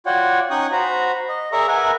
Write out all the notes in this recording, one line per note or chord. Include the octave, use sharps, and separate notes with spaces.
F4 F#4 C#5 D5 F#5 G5
C#4 D#4 G5 C#6 D#6 F#6
F#4 C5 A#5 B5
D#5
G#4 A#4 D5 E5 A#5 C#6
A#4 B4 E5 F#5 G#5